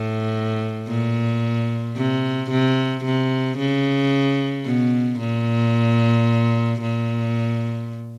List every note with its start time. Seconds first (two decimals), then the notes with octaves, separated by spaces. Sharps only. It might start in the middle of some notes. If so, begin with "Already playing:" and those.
Already playing: A2
0.88 A#2
1.96 C3
2.51 C3
3.05 C3
3.58 C#3
4.65 B2
5.20 A#2
6.81 A#2